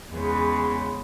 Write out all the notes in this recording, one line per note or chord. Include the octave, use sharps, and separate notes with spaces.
E2 C#3 G#3 B3